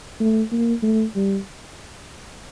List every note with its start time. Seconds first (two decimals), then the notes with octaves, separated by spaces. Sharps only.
0.20 A3
0.51 A#3
0.83 A3
1.16 G3